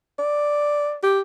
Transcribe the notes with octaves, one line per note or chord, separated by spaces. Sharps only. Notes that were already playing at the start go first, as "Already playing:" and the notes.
D5
G4